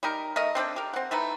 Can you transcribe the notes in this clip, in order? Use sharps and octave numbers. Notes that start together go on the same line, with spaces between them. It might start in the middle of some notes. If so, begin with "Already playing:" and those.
G3 D#4 A#4
A3 A#4 D#5
C4 D4 A4 G5
G4 A#4
C4 F#5
E3 A3 D#4 B4